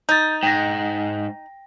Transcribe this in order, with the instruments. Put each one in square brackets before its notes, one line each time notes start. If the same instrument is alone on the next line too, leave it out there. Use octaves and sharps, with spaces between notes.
[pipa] D#4 [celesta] G6 A6
[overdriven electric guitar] G#2 [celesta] G5 A#6